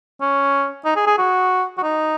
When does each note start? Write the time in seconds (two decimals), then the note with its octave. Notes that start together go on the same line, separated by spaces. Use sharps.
0.21 C#4
0.85 D#4
0.96 G#4
1.07 G#4
1.18 F#4
1.78 F#4
1.83 D#4